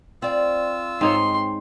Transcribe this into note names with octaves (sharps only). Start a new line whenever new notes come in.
C4 F4 D5 E6
G#2 C4 D#4 C#5 C6